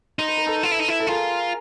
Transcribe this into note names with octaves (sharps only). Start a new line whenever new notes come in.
D#4 C5
B4
A#4
A4 B4
F4
E4
D#4
E4
A4
F4 G#4 A#4